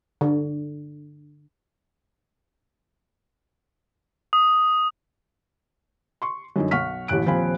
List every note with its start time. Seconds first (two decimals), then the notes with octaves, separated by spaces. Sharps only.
0.21 D3
4.33 D#6
6.22 C6 C#6
6.56 F#2 D3 D#4
6.71 B1 F#5 C#6 F6 B6
7.08 A1 D#2 A2 F#6 D7
7.26 D#1 F3 C4 F5 G#5 B5